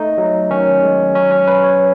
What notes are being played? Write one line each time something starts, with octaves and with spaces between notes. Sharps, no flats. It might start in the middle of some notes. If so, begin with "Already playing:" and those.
Already playing: A3 D#4
F#3
D#3 C#4
G#3
F#3 C#4
C#4
F#3 B4
C#5